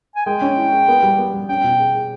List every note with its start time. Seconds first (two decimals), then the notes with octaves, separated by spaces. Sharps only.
0.16 G#5
0.26 G#3 G5
0.42 C#4
0.57 E4
0.73 G#4
0.88 B3
1.03 G3
1.18 B3
1.34 G3
1.49 C#4 G5
1.64 B2
1.80 G#4
1.95 G#4